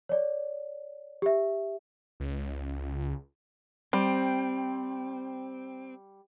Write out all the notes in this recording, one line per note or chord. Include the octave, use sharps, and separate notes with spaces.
C#5 D5
G4 E5
C#2
G3 C4